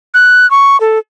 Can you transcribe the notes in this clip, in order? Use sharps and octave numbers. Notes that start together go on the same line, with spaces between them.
F#6
C#6
A4